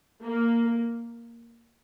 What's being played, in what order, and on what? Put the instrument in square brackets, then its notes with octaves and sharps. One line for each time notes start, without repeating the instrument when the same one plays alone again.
[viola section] A#3